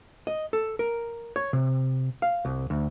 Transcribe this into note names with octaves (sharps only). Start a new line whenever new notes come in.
D#5
A4
A#4
C#5
C3
F5
C2
D2